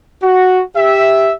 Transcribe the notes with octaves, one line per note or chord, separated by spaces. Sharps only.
F#4
G4 E5